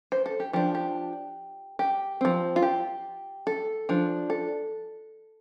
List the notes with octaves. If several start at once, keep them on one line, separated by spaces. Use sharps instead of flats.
C5
A4
G4
F3 D4 G4
G4
G4
F3 C4
F4
G4
A4
F3 D4
A4